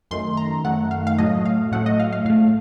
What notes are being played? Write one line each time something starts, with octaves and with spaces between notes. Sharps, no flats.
F#2 D#3 A3 C6
A#5
F#2 D#3 A3 F#5
F5
F5
A2 F#3 A3 D#5
F5
A2 F#3 A3 F#5
D#5
F5
F5
A2 A3 F5